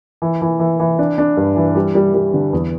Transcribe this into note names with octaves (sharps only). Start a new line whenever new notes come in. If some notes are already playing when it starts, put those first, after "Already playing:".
E3
E3
E3
E3
D4
D4
G2
E3
G3
G3
G3
D3
E2